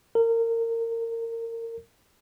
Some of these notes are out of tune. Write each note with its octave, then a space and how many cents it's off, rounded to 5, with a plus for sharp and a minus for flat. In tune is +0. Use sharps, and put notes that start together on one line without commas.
A#4 -25